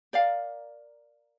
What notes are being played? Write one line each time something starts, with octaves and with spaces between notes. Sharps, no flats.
A#4 D5 F5